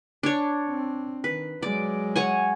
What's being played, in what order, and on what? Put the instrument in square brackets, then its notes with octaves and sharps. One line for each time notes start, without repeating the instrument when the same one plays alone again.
[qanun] D4 C#5
[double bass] C4
[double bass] D#3 [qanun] B4
[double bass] F#3 G#3 [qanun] D5
[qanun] C#5 F#5 G#5